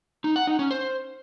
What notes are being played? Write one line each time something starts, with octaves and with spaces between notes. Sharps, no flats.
D#4
F#5
D#4
C#4
C5